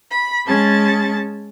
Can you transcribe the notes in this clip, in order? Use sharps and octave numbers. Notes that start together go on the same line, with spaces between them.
B5
G#3 C#4 G#4 A5 A6